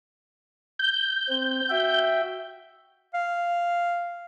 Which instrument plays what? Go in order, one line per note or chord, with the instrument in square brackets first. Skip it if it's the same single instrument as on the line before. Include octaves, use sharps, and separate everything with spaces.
[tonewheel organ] G6
[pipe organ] C4
F#4 E5 G5
[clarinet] F5